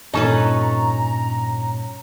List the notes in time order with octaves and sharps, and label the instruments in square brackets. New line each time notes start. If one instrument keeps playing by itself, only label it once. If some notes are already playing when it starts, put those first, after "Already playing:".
[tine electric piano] G2 A#2 [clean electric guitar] C#4 [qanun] D#4 A4 B4 [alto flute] A#5